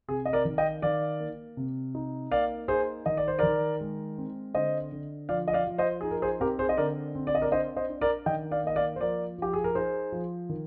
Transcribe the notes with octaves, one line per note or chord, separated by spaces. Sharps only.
C3 G#4
D#5
A#4 D5
D#3
D#5 G5
D#3 D5 F5
A#3
C3
D#4
A#3 D5 F5
D#4 G#4 C5
D#3 D#5
D5
C5
D#3 A#4 D5
G#3
C4
D3 C5 D#5
D3
F3 D5 F5
D#5
D5 F5
F3
C5 D#5
D#4 G#4
A#4
G#4 C5
C4 G4 A#4
G#4 C5
D#5
D3 A#4 D5
C4
D5
D#5
A#4 D5
D4 C5 D#5
C5 D#5
D4
A#4 D5
D#3 D#5 G5
D5 F5
A#3 D#5
D5 F5
C5
F3 A#4 D5
F3 G4
G#4
A#4
D#4 G#4 C5
F3
D#3